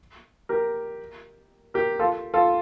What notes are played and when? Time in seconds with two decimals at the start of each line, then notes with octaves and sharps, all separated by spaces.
0.49 G4 A#4
1.74 G4 A#4
1.99 F4 A4
2.34 F4 A4